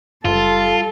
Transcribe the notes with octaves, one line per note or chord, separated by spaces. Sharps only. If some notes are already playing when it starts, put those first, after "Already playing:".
F#1 G3 F4 A4